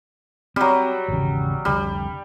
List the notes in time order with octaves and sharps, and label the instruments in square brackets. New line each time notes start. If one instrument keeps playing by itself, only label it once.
[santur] F#3 G3 [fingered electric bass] C4
[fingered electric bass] G#1 E2 C#3
[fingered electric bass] F1 C2 D3 [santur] G3